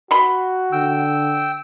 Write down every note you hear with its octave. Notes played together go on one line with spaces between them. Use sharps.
F#4 B5 C6
D3 G5 E6